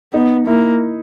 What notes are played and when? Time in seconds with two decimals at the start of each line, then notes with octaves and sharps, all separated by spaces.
0.14 B3 D#4
0.47 A#3 E4